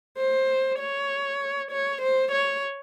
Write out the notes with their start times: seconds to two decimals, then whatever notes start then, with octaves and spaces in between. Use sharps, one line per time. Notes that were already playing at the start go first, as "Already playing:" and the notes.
0.17 C5
0.80 C#5
1.71 C#5
2.02 C5
2.32 C#5